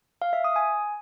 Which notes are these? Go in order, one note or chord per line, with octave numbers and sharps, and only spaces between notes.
F5
E5
D#6
G#5